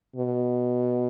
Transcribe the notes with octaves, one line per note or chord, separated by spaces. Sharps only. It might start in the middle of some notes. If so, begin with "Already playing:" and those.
B2